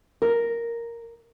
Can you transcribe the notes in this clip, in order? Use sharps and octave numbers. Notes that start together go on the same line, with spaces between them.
A#4